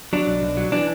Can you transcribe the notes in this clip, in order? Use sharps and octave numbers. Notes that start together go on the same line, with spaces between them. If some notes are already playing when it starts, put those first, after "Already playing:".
F#3 D4
B1
B1
F#3
E3 D4